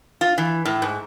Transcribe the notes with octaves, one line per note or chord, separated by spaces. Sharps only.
F4
E3
A2
G#2